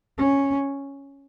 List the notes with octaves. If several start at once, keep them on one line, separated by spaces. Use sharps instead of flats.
C#4